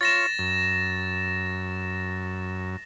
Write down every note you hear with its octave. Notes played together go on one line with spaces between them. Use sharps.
F4 C#5 A6 A#6 E7
F#2